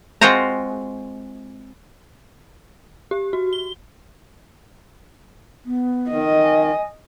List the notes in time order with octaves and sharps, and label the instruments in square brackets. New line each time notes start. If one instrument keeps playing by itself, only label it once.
[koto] G#3 C4 F4 F#4 C5 A#5
[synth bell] G4
F#4
G7
[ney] B3
[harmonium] D#3 [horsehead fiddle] D#5
[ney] G#5